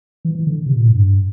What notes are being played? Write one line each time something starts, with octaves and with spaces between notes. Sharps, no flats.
E3
E3
D3
C3
A#2
A2
G2